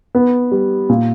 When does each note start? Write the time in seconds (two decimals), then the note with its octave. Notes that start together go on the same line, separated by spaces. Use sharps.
0.15 B3
0.52 G3
0.89 A#2